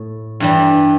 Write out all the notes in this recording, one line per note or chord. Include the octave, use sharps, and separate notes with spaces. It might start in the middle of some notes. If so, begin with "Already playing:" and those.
Already playing: A2
G2 E3 G3